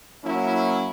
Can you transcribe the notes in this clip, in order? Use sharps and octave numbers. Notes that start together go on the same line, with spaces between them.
F#3 A#3 C#4 E4